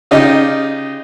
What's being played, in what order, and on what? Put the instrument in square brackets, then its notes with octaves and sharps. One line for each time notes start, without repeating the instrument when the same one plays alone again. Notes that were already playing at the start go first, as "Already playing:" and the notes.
[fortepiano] C#3 D#4 F4 G4 D#5